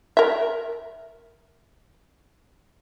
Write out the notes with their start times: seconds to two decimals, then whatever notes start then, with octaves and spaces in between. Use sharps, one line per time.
0.17 A#4 E5